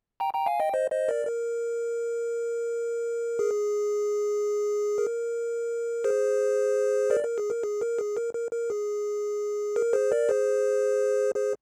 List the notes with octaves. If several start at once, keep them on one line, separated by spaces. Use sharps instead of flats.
G5 A#5
G5 A#5
F5 G#5
D#5 G5
C5 D#5
C5 D#5
A#4 D5
A#4
G#4
A#4
G#4 C5
A#4 D5
A#4
G#4
A#4
G#4
A#4
G#4
A#4
A#4
A#4
G#4
A#4
G#4 C5
A#4 D5
G#4 C5
G#4 C5